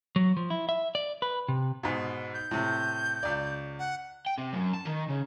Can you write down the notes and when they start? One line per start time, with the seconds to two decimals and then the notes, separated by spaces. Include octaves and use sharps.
0.16 F#3
0.37 F3
0.50 E4
0.69 E5
0.95 D5
1.22 B4
1.48 C3
1.83 G#2 B2
2.34 G6
2.51 A2 C3
3.23 C#2 D5
3.79 F#5
4.26 G5
4.38 C3
4.53 F#2
4.73 A5
4.85 D#3
5.09 C#3